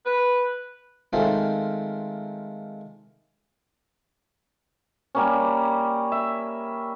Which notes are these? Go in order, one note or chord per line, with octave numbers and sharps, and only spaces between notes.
B4
D#3 G#3 A3 C4 F4 C5
G3 A#3 C#4
E5